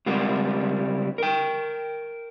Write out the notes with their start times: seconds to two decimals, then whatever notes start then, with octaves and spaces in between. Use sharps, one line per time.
0.06 C#2 G3 G#3 C4 A#4 F#5
1.18 A#4 G5